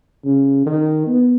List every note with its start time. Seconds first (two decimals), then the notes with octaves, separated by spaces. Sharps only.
0.25 C#3
0.66 D#3
1.07 B3